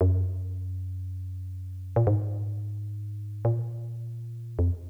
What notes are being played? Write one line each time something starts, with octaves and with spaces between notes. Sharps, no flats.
F#2
A#2
G#2
A#2
F2